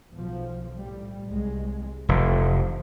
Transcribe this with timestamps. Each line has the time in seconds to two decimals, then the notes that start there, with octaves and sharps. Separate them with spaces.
0.14 B1 F3
0.76 A2 G3
1.28 C2 G#3
2.09 F1 E3 F3